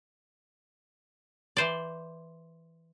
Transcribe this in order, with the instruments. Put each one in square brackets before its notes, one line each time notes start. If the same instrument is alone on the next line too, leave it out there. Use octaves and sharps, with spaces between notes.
[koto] E3 C5 D5